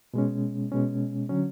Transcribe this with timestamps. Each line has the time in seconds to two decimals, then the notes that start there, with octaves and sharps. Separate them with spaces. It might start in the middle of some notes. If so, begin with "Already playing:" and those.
0.14 B2 G#3 C#4
0.72 B2 G#3 C#4
1.29 D3 F#3 C#4